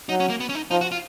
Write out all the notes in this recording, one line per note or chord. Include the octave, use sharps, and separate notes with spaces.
F#3 D#4
C#4
A#3
B3
C#4
D#4
F3 D#4
F#4
F4